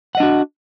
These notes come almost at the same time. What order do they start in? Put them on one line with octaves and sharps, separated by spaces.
F#5 D#5 D4 F#4